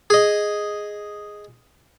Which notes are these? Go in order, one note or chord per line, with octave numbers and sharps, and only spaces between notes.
G#4 D#5